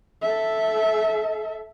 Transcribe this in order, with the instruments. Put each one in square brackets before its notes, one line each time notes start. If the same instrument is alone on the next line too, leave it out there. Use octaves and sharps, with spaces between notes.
[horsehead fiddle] A4 E5